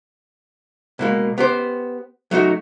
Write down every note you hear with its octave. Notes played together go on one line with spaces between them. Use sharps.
B2 G#3 A#3
B3 G4 C5
F#3 A3 D#4 F#4